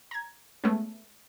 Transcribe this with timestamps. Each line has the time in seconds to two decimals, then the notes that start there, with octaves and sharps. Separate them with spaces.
0.11 A#5 G#6
0.64 G#3 A3 B3 C#4